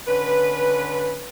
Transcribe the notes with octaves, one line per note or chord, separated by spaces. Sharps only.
D3 C#4 B4